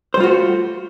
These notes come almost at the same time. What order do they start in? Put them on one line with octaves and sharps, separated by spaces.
C5 G3 F4 F#4 A3